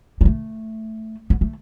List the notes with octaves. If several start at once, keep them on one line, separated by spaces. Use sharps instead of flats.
G3
A3
B3
A3